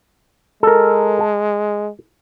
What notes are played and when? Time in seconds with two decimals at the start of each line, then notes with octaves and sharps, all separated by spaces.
0.63 G#3 A4 A#4
1.21 A5